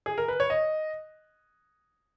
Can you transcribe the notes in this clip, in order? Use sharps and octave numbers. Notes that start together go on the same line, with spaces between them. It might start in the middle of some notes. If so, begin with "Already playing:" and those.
G#4
A#4
B4
C#5
D#5